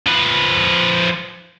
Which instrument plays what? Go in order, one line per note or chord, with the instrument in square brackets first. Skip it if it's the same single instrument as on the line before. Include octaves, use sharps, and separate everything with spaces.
[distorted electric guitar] F3 B4